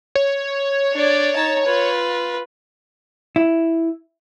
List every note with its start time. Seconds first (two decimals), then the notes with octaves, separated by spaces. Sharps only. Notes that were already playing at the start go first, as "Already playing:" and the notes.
0.15 C#5
0.93 D4 D5
1.36 D#4 A5
1.65 F4 B4
3.36 E4